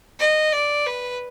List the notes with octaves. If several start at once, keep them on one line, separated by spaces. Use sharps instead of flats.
D#5
D5
B4